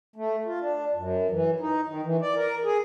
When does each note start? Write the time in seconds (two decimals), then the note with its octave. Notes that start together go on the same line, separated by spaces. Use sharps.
0.16 A3
0.46 F4
0.61 D4
0.95 F#2
1.31 E3
1.60 D#4
1.88 D#3
2.03 E3
2.21 D5
2.35 A#4
2.64 G#4